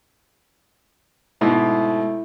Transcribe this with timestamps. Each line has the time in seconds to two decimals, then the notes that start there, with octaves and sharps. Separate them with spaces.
1.41 G#2 B2 A3 E4